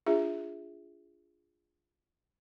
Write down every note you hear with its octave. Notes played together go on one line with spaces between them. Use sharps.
D4 F4 G#4 E5